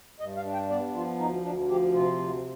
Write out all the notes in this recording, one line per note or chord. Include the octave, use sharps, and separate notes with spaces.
G2 D#5
F5
D4
G5
B3 D5
F3 F4
D2 D#4
D2 D4
F3 G4
C3 F4
D2